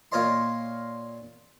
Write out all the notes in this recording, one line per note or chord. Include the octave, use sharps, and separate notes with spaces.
A#2 F4 A#4 C#5 D#5 C6